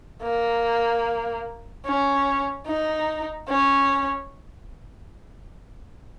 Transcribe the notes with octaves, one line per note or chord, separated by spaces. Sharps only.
A#3
C#4
D#4
C#4